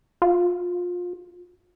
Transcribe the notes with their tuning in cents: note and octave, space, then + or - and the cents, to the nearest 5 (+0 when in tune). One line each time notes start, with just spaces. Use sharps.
F4 +25